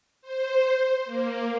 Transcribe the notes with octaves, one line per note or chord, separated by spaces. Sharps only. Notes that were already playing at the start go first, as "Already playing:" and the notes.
C5
A#3